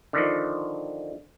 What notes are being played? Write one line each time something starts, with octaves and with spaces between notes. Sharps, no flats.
D3 D#3 F3